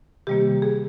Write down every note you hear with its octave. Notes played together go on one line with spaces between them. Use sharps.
C3 D#3 G3 A#3 G4
G#4